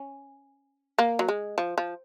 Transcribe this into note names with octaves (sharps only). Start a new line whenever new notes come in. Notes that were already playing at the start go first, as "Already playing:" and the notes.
Already playing: C#4
A#3
F#3
G#3
F3
F3